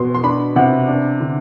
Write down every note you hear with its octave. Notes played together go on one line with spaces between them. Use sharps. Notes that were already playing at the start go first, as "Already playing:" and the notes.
Already playing: B2 C6
C6
D4 B5
C3 F#5
D4
D3